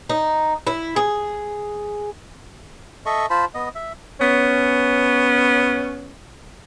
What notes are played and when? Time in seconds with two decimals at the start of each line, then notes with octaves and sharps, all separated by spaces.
0.09 D#4
0.67 E4
0.96 G#4
3.06 A4 D#5 E5 C#6
3.30 F4 C5 A5 B5
3.54 B3 D#5
3.75 E5
4.21 B3 C#4